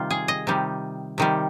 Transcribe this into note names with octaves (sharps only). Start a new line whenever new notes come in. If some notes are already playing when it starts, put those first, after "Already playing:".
Already playing: C3 D#3 G3 F4
G#4
D#5
C3 D#3 G3
C3 D#3 G3